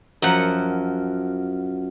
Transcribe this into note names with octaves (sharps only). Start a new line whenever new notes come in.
F#2 F3 F#5